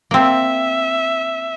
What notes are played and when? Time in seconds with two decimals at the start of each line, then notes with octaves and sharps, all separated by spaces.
0.11 A#3 C4 E5